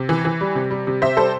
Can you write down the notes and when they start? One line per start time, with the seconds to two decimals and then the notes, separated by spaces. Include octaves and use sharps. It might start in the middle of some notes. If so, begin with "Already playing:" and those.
Already playing: C3
0.09 E3
0.25 E3
0.41 G3
0.55 C3
0.71 G3
0.87 C3
1.02 C3 C5 E5
1.17 G3 A4 C5